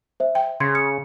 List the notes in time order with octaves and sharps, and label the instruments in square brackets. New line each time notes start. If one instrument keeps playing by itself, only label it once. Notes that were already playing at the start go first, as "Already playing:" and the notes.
[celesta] C5 E5
[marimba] G5
[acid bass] C#3 [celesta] C6 G#6
[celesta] C#7